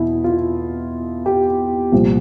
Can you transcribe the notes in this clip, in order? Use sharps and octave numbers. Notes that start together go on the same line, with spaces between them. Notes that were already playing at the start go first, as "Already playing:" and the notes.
Already playing: E2 B2 E4
F4
G4
C2 A#2 F3